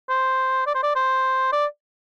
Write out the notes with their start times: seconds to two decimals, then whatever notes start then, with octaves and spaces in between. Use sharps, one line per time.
0.09 C5
0.67 D5
0.75 C5
0.83 D5
0.96 C5
1.53 D5